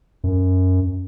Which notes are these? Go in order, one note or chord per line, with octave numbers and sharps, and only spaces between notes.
F#2